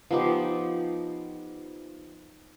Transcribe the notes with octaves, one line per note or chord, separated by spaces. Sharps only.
F3 B3 D#4 G4